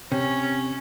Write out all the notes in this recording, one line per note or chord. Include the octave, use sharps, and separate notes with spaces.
C3 C#4